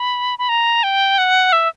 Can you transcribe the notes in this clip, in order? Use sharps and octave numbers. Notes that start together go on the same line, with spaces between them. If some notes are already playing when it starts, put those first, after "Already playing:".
Already playing: B5
B5
A#5
G5
F#5
E5